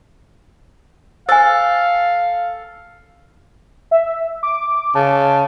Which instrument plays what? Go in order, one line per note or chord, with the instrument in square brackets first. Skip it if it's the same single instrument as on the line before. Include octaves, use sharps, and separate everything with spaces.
[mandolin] A4 [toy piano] C5 G#5 [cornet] F5
[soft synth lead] E5
D6
[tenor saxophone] C#3 [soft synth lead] A5